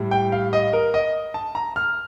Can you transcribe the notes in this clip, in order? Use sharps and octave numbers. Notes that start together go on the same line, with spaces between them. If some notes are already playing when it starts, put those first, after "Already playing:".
Already playing: A2 G3
G5
F5
D#5
A#4
D#5
A5
A#5
F6